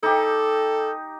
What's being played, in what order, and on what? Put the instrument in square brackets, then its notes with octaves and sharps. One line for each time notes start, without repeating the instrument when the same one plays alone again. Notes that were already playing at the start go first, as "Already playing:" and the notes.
[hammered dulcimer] D#4 G4 [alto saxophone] A4